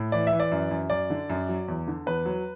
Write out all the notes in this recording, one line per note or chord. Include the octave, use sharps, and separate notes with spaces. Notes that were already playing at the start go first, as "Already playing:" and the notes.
Already playing: A2
E3 D5
E5
E3
D5
F#2
F#2
F#2 D5
D3
F#2
F#3
E2
D3
E2 B4
F#3